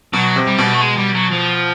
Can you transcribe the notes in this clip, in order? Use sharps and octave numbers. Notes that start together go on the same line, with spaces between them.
B2 F#3
C3
G3
B2
A3
G#3
G3
F#3
F3